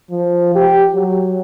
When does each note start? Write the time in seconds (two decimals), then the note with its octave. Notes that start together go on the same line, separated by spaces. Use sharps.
0.11 F3
0.55 G4
0.95 F#3